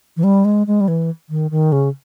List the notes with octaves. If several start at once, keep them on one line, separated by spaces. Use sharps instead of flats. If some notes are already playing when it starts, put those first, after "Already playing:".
E3
G3
G#3
G#3
G3
E3
D#3
D#3
C#3